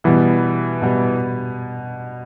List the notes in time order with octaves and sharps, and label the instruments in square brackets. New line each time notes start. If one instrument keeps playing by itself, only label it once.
[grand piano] B2 G3 B3 [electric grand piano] E3
[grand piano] B2 G3 B3